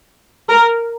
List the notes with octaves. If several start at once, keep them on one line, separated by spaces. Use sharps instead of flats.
A#4